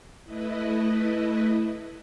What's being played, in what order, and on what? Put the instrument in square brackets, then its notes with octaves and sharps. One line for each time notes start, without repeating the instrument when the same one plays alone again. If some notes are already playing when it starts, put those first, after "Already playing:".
[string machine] A3 E4 B4 D#5